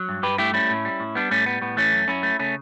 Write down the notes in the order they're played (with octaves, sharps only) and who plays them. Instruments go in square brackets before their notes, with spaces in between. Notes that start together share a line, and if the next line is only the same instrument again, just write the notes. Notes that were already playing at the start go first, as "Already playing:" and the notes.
Already playing: [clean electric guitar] F#3
G2
G2 G4 B4
A3 E4 G4
G3 C#4 E4
A2
G3
A2
G3 B3 D4
A2 A3 C#4
G3 B3
A2 B3
E3 A3 C#4
F#2
F#2 C#4 E4
A3
C#3 A3 C#4